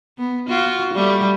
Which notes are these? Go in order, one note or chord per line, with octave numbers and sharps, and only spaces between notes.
B3
F4 F#4
G3 A3 G4